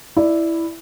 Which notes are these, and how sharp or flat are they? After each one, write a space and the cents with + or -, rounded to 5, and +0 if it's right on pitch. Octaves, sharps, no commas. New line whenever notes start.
E4 +0 D5 +10